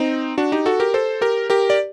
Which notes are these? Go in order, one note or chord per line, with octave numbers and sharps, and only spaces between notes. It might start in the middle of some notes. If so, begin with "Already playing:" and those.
Already playing: C4 D#4
D4 F#4
D#4 G4
F#4 A4
G4 A#4
A4 C5
G4 A#4
G4 A#4
D5